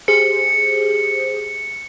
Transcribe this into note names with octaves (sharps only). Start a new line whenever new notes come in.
G4 G#4 C5 C#7